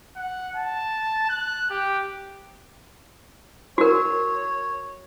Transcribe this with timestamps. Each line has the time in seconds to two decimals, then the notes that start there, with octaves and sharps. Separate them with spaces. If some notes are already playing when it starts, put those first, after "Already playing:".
0.16 F#5
0.55 A5
1.29 F#6
1.70 G4
3.78 F#4 A#4 C#5